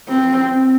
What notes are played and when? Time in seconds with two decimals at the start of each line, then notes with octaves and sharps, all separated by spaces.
0.08 C4